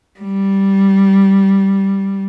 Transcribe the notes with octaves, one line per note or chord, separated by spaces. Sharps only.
G3